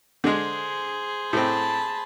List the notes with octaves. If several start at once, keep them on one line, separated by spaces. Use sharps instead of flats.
D3 G#3 G#4 C5
A2 C4 A5 B5